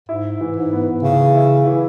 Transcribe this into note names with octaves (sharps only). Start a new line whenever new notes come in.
G#2 E4
E3
G#2
B3
C#3 E3
E4
E3